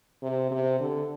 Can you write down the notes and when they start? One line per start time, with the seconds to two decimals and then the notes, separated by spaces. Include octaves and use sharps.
0.22 C3
0.51 C3
0.80 D3